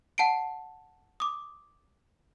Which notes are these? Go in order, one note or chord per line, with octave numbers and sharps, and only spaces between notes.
F#5 A5 C7 D7
D6 D#6